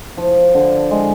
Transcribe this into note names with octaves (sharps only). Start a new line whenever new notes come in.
F3
D3
G#3